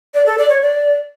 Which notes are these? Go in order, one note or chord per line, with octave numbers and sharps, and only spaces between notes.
D5
A4
D5
C#5
D5